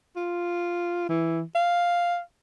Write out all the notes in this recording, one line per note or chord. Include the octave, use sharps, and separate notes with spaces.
F4
E3
F5